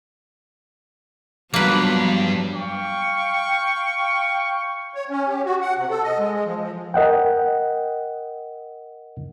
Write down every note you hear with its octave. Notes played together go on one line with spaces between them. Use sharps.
G2 F3 F#3 A#3 B3 B4
F5 G5 C#6
C#5
C#4
G4
F#4
F#5
C3
A4
D#5
G#3
G#3
F3
F3
A#4 D#5 F#5 G5